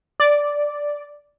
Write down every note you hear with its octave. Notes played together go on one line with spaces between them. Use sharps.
D5